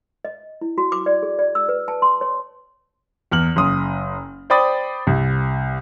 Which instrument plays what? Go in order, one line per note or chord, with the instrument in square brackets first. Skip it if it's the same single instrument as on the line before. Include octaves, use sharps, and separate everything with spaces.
[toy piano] D#5
E4
F#4
D6
D5
G#4
D5
E6
B4
A5
C6
C#5
[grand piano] E2 F6 F#7
F#1 C6 D#6
C5 D5 G5 B5 D#6 A6
C2